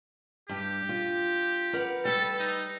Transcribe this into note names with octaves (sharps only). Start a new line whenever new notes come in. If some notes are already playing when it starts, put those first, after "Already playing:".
G2 G4
F4
A#4 B4 F#5
G3 A4 B4
D#4